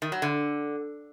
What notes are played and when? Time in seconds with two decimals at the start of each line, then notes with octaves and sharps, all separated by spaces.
0.02 D#3
0.12 F#3
0.22 D3